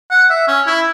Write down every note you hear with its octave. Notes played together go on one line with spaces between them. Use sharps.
F#5
E5
C#4
E4